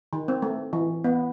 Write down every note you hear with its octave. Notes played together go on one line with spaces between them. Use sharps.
D#3
C4
A3
E3
B3